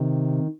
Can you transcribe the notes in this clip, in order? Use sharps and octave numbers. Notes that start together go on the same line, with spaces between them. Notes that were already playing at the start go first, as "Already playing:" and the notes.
Already playing: C3 D#3